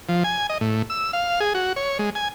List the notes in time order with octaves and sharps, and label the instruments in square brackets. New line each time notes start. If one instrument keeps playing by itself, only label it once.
[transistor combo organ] F3
G#5
D#5
A2
E6
F5
G#4
F#4
C#5
G#3
G#5